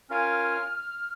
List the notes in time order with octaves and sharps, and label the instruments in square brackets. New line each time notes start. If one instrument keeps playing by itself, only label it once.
[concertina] C#4 F4 A#4 F5 G#5 [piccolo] F6